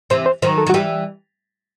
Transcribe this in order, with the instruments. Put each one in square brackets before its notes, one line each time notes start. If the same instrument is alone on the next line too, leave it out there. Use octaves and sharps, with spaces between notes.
[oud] C3 E3 [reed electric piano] C5
[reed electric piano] C5
[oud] D#3 F#3 [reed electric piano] C5
[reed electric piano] A4
[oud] F#3
[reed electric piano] F#4
[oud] E3 G3 [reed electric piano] G4